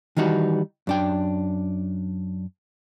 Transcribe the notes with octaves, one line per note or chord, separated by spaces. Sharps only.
D#3 E3 G3 D#4 F#4
F#2 D4 G5